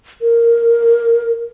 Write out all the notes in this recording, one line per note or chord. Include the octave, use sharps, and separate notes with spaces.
A#4